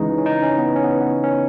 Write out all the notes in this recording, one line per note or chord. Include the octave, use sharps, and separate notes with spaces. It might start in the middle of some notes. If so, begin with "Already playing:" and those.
Already playing: C#2 C#3 E3 G#3 D#4
C#4
D#4
C#4
B3
C#4
B3
B3
C#4